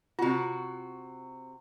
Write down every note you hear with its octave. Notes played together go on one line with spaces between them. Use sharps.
C3 F4 F#4